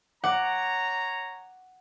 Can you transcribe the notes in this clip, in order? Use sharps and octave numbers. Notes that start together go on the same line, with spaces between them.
C#5 F#5 A#5 D6